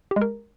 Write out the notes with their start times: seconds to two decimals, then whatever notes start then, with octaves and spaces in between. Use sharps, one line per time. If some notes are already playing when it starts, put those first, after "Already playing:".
0.11 G4
0.16 G#3
0.22 A#4